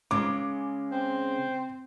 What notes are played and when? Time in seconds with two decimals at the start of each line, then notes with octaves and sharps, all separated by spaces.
0.11 C#3 G#3 D6
0.92 C4